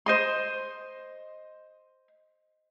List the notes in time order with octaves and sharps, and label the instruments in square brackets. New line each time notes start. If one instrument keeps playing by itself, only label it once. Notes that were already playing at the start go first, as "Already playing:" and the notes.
[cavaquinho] C5 D#5 C6